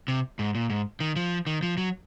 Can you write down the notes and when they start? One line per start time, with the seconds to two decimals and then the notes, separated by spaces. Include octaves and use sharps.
0.08 C3
0.39 G#2
0.55 A#2
0.70 G#2
1.00 D#3
1.16 F3
1.47 D#3
1.63 F3
1.77 F#3